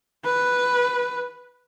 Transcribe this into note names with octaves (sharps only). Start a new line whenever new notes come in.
B4